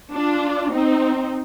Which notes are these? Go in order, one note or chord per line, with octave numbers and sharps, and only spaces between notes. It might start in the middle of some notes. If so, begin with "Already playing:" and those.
D4 F4
C4 D#4